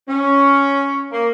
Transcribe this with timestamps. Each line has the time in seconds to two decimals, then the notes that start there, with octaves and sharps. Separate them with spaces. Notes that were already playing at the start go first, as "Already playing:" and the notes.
0.08 C#4
1.12 A#3